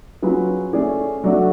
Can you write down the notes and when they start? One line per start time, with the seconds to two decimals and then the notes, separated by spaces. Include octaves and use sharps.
0.22 F#3 C#4 F4 G#4 B4
0.73 A3 C#4 G#4 D5
1.24 F#3 A3 D4 F#4